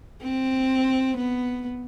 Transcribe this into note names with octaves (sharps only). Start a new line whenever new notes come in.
C4
B3